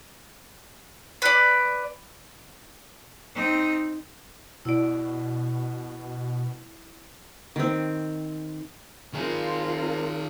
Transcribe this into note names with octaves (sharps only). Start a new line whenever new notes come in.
B4 D5
C4 D#4
B2 E4 D5
D#3 C4
D#3 C4 F4 G#4 A#4